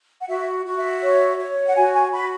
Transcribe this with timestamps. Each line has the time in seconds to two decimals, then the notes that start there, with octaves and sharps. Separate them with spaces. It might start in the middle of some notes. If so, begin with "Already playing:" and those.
0.21 F#5
0.28 F#4 E5
0.65 F#4
0.77 E5
1.02 C#5
1.38 C#5
1.67 F#5
1.76 F#4 G#5
1.94 G#5
2.12 F#4 B5